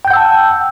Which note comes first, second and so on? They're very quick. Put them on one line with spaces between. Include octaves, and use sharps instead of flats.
G5 G6 F#5 E6 A5